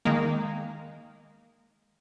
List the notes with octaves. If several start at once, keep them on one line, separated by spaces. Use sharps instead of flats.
D#3 G#3 A#3